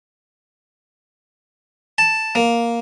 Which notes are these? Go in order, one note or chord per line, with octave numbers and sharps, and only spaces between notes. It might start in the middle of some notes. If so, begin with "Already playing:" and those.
A5
A#3